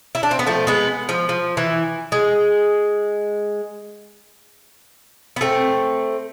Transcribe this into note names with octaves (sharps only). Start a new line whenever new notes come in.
E4
D4
C4
B3
F3 A3
G#3 B3
F3
F3
E3
G#3
B3
A3 C4